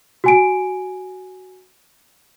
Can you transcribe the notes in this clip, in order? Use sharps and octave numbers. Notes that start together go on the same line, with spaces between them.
F#4 G#5 D7